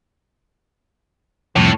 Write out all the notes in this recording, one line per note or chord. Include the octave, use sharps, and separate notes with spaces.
C2 F2 A2